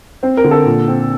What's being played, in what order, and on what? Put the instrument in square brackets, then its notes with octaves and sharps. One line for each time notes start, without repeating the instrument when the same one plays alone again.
[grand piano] C4 C5
A#4
D3
A4
A#2
C4